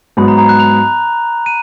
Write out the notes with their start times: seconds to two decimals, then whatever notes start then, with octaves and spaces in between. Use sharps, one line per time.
0.17 G#2 F#3 B3 B5
0.28 A#5
0.38 A#5
0.49 F#6
0.60 F7
1.46 D#7